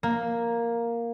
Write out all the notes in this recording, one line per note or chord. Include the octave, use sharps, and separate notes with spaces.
A#3